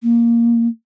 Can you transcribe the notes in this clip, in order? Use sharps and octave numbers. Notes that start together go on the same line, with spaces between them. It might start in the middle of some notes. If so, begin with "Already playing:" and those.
A#3